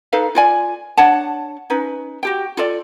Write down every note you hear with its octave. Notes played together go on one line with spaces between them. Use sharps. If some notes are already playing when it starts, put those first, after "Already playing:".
D#4 A4 B4 F5
F4 D5 G#5
D4 C#5 F#5 A5
C#4 D#4 B4
F#4 G4 G5
F4 A4 D5